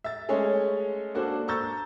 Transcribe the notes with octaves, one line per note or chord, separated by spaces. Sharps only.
E5 A6
G#3 A3 C#4 G#4 C#5
A#3 D4 F#4 A4 C5
A#5 C#6 E6 G6 A6